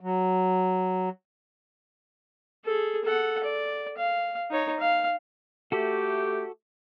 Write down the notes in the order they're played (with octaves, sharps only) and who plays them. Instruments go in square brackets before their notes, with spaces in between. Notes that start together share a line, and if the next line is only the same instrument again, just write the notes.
[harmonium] F#3
[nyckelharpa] G#4 A4
A4 F#5
D5
F5
D#4 C#5
F5
[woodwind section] A3 G4 [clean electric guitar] F#4 A4